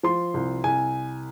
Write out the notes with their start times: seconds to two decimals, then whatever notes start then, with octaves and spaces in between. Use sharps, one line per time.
0.03 F3 C6
0.34 C2
0.64 C2 G#5